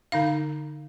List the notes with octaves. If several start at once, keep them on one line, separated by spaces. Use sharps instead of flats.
D3 D#4 F5